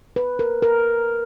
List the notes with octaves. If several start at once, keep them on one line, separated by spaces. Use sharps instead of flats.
B4
A#4
A#4